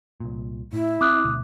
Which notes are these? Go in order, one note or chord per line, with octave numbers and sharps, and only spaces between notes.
C2 A#2
A2 E4
C4 D6 D#6 F#6
D2 B2